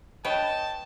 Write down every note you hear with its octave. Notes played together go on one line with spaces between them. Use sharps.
B4 C#5 D#5 G5 A5